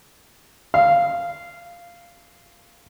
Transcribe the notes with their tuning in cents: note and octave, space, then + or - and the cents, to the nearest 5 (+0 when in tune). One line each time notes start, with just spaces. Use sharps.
F5 -10